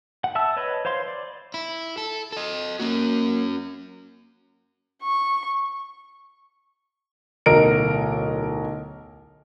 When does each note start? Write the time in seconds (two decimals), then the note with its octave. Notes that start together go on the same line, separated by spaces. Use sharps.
0.24 F#5
0.35 E5 F#5 A5 E6
0.56 B4 C#5 D#5 B5
0.85 C5 C#5 F5 C6
1.08 D5
1.54 E4
1.98 A4
2.32 A4 D#5
2.79 A#3 C#4 F#4
5.03 C#6
7.46 D1 B1 A#4 D#5 D7